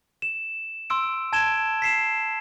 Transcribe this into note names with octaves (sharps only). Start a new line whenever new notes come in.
E7
C6 E6 D7
A5 G#6 D7 E7 G7
B6 C7 E7